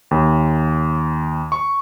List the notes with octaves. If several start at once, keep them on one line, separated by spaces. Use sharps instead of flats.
D#2
C#6